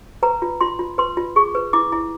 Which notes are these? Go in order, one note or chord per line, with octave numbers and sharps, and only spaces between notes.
B4 A#5
F4
F4 C6
F4
B4 C6
F4
G#4 C#6
B4
E4 D6
E4